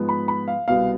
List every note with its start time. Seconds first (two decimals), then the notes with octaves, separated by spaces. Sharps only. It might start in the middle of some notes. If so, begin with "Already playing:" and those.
Already playing: G#2 F3 B3
0.09 B5
0.28 B5
0.48 F5
0.67 C2 B2 B3 F5